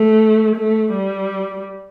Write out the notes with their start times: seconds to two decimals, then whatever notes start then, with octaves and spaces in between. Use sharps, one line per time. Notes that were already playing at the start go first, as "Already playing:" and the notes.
Already playing: A3
0.55 A3
0.93 G3